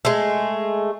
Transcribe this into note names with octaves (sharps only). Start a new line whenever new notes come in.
G#3 A3